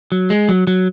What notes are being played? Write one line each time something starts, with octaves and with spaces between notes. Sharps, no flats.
F#3
G#3
F#3
F#3